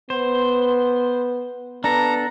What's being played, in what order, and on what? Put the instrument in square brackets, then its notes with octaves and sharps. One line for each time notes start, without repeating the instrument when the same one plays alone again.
[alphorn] B3 [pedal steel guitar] C5
[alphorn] B3 [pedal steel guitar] D4 A4 [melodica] A#5